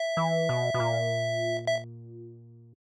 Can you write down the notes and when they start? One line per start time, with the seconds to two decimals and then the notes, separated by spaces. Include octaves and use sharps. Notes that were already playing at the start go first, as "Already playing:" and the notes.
Already playing: E5
0.17 E3
0.49 B2
0.74 B2
0.80 A#2
1.67 E5